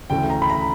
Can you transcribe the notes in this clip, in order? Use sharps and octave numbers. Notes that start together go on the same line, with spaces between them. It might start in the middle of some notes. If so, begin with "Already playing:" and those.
D2 C#3 E3 A3 G5
A#5
B5
A#5